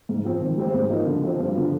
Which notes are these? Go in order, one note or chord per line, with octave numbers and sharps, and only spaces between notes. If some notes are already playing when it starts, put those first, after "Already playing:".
G#2
F3 C4
D#3
G#3 C4 G4 C5
G#2
F3 A#3 D#4
D3
F3 C4
G2
D3 F3